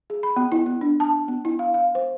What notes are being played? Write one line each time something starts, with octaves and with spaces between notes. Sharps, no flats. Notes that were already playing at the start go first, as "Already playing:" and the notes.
G#4
B5
B3
E4
B3
D4
A5
B3
E4
F5
F5
C5